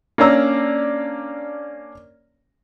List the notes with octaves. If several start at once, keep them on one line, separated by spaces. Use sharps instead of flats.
A#3 C#4 D4 A#5 E6